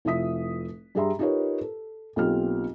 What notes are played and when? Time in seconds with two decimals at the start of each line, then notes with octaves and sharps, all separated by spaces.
0.05 F1 E4 F4 E5 D#6 B6
0.95 G2 G3 G#4 E5 A#5 C6
1.19 D#4 F4 G4 A#4 B4 C#5
1.61 A4
2.16 B1 A#3 C4 F4 G4 F6